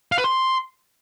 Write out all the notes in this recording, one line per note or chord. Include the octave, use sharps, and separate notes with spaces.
F5
B4
C6